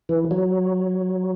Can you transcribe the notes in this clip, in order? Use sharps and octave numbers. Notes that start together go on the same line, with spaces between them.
E3
F#3